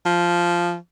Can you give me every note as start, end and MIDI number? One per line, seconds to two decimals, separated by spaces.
0.05 0.76 53